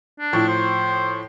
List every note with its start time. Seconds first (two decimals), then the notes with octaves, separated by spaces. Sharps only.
0.20 D4
0.33 A2 F3
0.48 C5